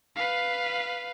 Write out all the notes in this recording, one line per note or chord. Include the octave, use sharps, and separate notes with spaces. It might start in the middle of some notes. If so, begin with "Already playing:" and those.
B4 F5